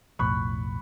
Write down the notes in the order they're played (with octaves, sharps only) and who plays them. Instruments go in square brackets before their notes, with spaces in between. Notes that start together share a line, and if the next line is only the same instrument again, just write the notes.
[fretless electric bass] B1 F2 A2 [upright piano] B5 C#6 F#6